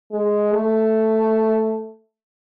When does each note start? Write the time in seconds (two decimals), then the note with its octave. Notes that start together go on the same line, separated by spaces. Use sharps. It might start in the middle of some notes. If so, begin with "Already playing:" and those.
0.12 G#3
0.53 A3